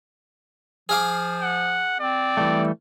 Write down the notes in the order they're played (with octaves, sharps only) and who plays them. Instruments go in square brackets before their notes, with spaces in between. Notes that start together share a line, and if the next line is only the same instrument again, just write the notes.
[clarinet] F3 [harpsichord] G#4 F5 D6
[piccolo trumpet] F#5
[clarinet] C4 [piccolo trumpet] D5
[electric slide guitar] E3 G3 A3